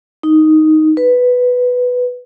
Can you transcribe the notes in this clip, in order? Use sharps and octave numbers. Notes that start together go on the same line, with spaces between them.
D#4
B4